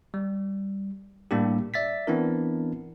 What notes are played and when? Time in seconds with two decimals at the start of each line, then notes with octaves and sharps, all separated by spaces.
0.14 G3
1.31 A2 G3 A#3 D4 G4
1.74 D5 E5 A6 B6
2.07 E3 B3 C4 D4 E4 A#4